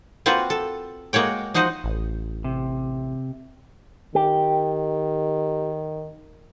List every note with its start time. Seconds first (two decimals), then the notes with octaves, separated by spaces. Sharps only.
0.26 A#3 C4 F4 F#4 B4
0.50 A4
1.13 G#3 A#3 F#4 C#5 G5
1.54 F3 D#4 F#4 C5 D#5
1.84 A1
2.44 C3
4.15 D#3 G4